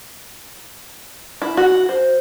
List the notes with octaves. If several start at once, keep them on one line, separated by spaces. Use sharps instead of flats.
E4
F#4
C5